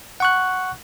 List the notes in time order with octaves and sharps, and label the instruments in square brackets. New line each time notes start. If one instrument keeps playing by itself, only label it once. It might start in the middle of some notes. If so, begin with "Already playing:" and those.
[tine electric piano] F#5 C#6 F#6